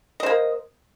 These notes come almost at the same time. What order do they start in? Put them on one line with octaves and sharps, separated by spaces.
D#5 C5 A#3